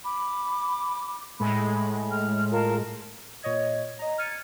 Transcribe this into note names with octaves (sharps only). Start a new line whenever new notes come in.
B5 D6
A2 G#3 B5
F6
F4 A#4 A5
A#2 C#5 D#5 G#6
D#5 A#5
F6 G#6 A6 C#7 D#7